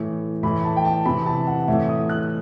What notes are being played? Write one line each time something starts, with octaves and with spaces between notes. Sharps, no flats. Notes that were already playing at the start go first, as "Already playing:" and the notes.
Already playing: A2 E3
A2 E3 B5
A5
G5
A5
C3 E3 B5
A5
F#5
A2 E3 E5
D#6
F#6